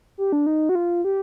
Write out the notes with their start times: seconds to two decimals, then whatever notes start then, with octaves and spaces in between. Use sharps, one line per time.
0.18 G4
0.32 D4
0.46 D#4
0.69 F#4
0.75 F4
1.04 G4